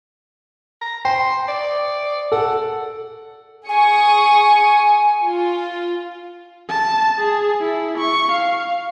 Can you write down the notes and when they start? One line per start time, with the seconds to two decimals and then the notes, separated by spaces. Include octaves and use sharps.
0.81 A#5
1.05 G5 C6
1.48 D5
2.32 A4 F#5
3.69 G#4 G#5 C#6 D#6
5.23 F4
6.69 A5
7.19 G#4
7.61 E4
7.98 C#6
8.32 F5